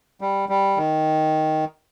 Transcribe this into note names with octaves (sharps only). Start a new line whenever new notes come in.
G3
G3
D#3